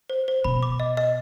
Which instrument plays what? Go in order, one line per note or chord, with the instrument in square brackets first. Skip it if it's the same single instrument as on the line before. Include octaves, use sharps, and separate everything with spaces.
[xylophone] C5
C5
[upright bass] B2 [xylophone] B5
[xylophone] D6
D#5
D#5